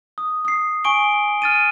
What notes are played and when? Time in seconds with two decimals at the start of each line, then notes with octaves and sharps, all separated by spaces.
0.18 D#6
0.45 D#6 C7
0.84 G#5 C#6 D7 G7
1.42 F6 A6 D#7